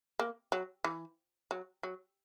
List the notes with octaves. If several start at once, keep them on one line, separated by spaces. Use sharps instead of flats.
A#3
F#3
E3
F#3
F#3